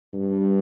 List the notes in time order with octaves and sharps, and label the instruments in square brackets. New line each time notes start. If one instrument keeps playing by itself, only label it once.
[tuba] G2